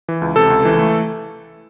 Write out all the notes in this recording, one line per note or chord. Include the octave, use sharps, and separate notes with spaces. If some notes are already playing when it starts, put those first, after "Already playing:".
E3
C#2
C3 A4
C#2
E3
A3